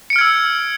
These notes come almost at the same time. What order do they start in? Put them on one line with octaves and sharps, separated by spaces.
C#7 D7 F6 G#6 E6